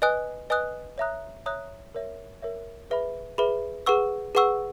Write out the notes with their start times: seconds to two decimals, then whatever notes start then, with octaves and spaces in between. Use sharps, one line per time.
0.02 B4 D#5 G#5 D#6 F#6
0.50 B4 D#5 G#5 D#6 F#6
0.98 C#5 E5 A#5 D#6 F#6
1.46 C#5 E5 A#5 D#6 F#6
1.95 A#4 C#5 E5
2.42 A#4 C#5 E5
2.90 G#4 B4 E5 B5
3.38 G#4 B4 E5 B5
3.86 G#4 B4 F#5 C#6 E6
4.35 G#4 B4 F#5 C#6 E6